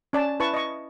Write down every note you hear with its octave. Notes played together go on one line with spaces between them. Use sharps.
C#4 D5 A5
E4 B4 A5 C#6
D#5 C#6